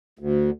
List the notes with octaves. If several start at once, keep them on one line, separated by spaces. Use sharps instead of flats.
D2